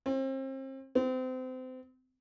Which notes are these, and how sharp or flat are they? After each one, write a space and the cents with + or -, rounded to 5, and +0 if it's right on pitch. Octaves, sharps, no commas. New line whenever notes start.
C4 +35
C4 -30